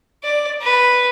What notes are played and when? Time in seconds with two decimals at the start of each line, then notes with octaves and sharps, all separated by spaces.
0.23 D5
0.61 B4